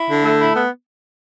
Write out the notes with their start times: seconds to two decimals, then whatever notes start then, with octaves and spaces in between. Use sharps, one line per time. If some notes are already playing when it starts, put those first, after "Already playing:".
Already playing: E4
0.08 D3
0.23 A3
0.38 E4
0.54 B3